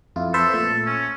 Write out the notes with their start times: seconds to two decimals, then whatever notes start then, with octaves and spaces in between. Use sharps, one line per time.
0.16 F2 E4 F4
0.34 A4 B4 C5 E5
0.53 A#2 A3
0.86 C#4